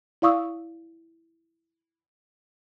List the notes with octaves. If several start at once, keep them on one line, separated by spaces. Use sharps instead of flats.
E4 D5 F5 C#6 D#6 E6